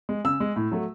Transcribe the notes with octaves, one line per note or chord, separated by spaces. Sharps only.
G#3
C#3 E6
G#3
A2
F#3 A3